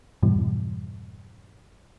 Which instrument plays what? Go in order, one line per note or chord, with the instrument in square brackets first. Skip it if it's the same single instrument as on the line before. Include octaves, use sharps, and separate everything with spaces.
[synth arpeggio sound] F2 G#2 B2 E3 G3